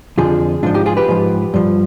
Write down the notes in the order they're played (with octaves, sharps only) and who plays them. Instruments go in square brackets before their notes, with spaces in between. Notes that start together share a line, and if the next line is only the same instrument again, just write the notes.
[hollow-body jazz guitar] F2 D3 F3 F4 G#4
G#2 F3 D4 F4
D#4 G4
F4 G#4
G4 B4
G#2 F3
G2 F3